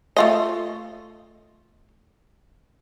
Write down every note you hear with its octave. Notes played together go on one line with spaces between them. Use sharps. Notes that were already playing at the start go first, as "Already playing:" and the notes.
A3 F4 D#5